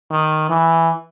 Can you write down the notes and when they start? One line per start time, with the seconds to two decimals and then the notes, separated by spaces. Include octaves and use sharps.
0.11 D#3
0.49 E3